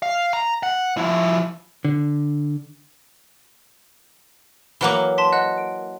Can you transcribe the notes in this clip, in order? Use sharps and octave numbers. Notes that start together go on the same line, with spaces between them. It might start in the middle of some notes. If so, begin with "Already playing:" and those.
F5
A#5
F#5
F3 E4
D3
E3 F#3 A#3 D6 F#6 G7
A5 C6 B6
D#5 F#5 F#6
D7